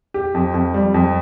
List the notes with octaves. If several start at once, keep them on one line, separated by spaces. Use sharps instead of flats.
G4
F2
F2
G3
F2